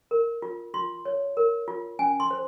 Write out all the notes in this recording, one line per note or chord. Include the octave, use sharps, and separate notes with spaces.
A#4
F4
F4 C6
C#5
A#4
F4
C#4 G#5
C6
C5